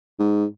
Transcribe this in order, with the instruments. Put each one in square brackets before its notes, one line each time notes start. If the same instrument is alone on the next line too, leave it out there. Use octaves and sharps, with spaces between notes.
[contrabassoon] G#2